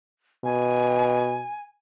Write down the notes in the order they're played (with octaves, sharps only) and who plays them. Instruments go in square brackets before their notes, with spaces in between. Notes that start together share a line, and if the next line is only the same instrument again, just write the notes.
[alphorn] B2 [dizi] G#5